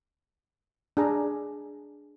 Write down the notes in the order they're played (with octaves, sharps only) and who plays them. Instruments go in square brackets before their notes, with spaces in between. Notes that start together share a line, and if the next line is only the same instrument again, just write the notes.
[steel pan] D4 G#4 A#5